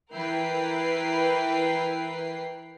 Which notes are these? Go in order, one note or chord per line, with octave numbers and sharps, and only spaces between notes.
E3 E4 A#4 B4 G5 C7